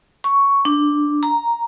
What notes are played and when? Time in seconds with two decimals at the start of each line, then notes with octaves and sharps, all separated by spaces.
0.24 C#6
0.65 D4
1.23 A#5